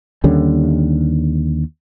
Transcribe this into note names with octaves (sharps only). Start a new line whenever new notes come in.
D#2 D3 G3 C#4